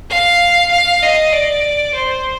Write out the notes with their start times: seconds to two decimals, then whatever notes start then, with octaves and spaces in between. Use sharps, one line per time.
0.10 F5
0.71 F5
1.03 D#5
1.33 D5
1.94 C5